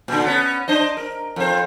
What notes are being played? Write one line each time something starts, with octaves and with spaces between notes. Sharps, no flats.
A#2 D3
B3 C#4
D4 C5 D#5
A#4
F2 C5